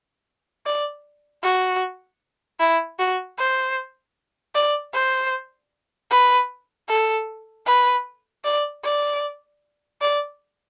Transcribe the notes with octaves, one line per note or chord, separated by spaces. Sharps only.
D5
F#4
E4
F#4
C5
D5
C5
B4
A4
B4
D5
D5
D5